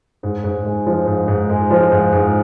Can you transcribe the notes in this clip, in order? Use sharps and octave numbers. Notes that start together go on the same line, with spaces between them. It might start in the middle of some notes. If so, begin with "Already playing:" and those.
G#2
G#2
G#3
F3
G#2
G#2
G#3
F3
G#2
G#2